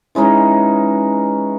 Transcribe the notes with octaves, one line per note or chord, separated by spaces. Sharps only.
E3 G#3 C#4 D#4